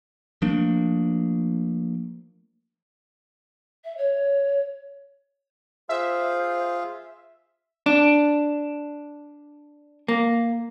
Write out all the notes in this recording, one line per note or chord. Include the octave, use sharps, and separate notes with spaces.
F3 A3 A#3 D4
E5
C#5
F4 G#4 C5 E5 F5
D4
A#3